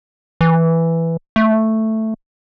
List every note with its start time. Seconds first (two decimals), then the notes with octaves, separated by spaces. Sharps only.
0.41 E3
1.36 A3